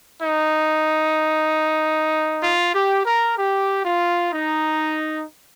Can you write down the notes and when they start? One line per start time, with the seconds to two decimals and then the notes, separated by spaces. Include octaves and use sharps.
0.21 D#4
2.42 F4
2.74 G4
3.05 A#4
3.36 G4
3.84 F4
4.32 D#4